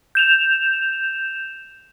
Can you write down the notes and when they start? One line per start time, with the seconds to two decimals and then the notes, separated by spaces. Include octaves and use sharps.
0.15 G6 E7 F7